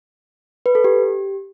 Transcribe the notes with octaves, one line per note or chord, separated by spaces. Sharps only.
B4
A4
G4